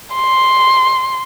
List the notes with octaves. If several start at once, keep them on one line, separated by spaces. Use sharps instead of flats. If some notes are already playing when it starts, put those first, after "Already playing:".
C6